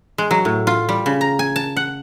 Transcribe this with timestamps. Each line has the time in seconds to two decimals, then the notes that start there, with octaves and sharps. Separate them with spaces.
0.18 G#3
0.31 F#3
0.45 A2
0.67 F4
0.89 G3
1.06 C#3
1.21 A#5
1.39 G#5
1.56 A5
1.77 F#5